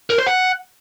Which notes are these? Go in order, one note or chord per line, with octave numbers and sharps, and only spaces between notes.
A#4
C5
F#5